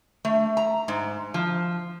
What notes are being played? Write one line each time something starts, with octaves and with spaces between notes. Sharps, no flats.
A3
A#5
G#2
F3